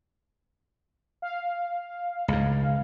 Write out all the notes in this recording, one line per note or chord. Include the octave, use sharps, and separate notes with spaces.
F5
C#2 G#2